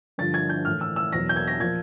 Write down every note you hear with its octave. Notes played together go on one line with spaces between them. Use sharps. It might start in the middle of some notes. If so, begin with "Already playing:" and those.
G2 D3 F3 A6
G#6
G6
A2 E3 F6
E6
E6
E2 B2 F#3 A#6
G6
G#6
A#6
A#2 F3 G#6